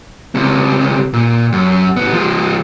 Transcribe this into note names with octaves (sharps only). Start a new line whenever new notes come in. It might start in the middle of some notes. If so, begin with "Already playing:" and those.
C#2 C3
A#2
F#2
A2 B3
F3 G#3